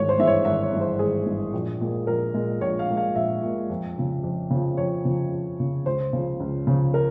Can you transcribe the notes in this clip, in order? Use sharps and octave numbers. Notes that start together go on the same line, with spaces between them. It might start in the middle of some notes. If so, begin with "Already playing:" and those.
Already playing: G#1 G2 E3 G#3 C#5
C5
G2 E3 G#3 E5
C#5
G#1 E5
C#5
G2 E3 G#3
C5
G#1 G#4
G2 E3 G#3
A#1
A#2 G#3
A#1 A#4
A#2 G#3
A#1 C#5
F5
A#2 G#3
F5
A#1 E5
A#2 G#3
F2
C#3 F3
F2
C#3 F3
F2 C#5
C#3 F3
F2
C#3 F3
C#2 C5
C#3 F3
C#2
C#3 F3
A#4